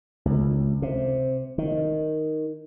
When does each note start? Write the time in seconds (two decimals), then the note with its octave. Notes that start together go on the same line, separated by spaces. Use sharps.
0.25 C#2
0.82 C3
1.58 D#3